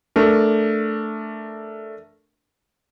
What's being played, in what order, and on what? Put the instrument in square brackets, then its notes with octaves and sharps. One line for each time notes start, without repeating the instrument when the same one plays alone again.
[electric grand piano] A3 D4 A#4